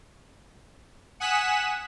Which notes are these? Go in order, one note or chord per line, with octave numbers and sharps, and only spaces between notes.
F#5 G#5 D#6 F#6 B6 E7